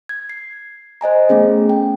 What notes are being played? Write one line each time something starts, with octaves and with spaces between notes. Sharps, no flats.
G#6
C7
C5 D#5 G#5 A#5
A3 B3 C#4 G#4
G5